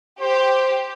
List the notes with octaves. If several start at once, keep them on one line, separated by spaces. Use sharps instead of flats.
G4 C5